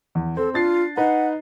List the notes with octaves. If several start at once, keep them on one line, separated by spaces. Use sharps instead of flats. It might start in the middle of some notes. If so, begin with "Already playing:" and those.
E2
C4 A4
D4 F4 A6 C7
D#4 B4 F#5 A#5